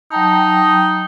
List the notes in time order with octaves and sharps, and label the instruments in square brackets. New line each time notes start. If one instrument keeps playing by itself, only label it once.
[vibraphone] F#3 G5 A5 [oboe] D#4